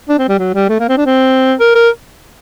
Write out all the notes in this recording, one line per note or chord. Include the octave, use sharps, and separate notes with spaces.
D4
C4
G3
F#3
G3
A3
A#3
C4
D4
C4
A#4
A#4